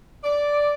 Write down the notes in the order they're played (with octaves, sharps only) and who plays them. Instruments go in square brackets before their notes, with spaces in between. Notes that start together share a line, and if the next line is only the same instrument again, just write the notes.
[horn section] D5